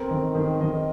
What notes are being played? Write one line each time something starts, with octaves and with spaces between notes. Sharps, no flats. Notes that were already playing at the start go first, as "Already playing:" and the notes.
Already playing: C4 A#4
D#3
D#3
D#3 D#5